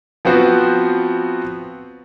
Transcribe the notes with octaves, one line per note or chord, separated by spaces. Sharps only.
F3 B3 C4 F#4